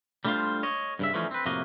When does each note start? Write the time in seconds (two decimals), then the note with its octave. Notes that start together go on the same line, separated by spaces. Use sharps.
0.25 G3 A3 D4 D#4 F4 C5
0.63 C#5 D#5
0.99 G2 C#3 E5
1.14 D3 E3 F3 A3 C#4 D#4
1.31 C4 B4
1.46 F2 A2 C3 A#3 F#4 D#5